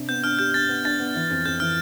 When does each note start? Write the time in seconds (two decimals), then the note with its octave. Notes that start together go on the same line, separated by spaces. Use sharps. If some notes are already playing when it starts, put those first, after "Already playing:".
Already playing: C3 D4
0.09 B3 G6
0.24 D4 F6
0.39 G4 G6
0.54 D4 A6
0.69 B3
0.85 D4 A6
0.99 B3
1.15 E3
1.31 F2
1.46 F2 G6
1.60 E3 F6